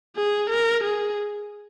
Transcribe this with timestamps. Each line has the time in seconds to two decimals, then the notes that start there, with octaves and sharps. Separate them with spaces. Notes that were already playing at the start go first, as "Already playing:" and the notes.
0.17 G#4
0.50 A#4
0.83 G#4